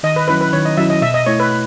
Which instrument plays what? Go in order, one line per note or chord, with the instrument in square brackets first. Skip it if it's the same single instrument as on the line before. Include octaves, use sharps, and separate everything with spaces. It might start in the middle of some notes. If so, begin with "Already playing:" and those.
[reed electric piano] D#3 [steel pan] D#5
[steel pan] B4
[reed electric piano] F#3 C#4 E4 [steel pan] B4
[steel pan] B4
[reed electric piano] D#3 [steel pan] C#5
[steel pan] D#5
[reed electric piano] F#3 C#4 E4 [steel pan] E5
[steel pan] D#5
[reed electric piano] B2 [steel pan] E5
[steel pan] D#5
[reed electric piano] A3 E4 [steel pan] C#5
[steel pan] B4